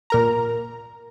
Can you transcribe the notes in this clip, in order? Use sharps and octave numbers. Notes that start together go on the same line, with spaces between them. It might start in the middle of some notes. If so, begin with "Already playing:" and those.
A#2 A#4 A#5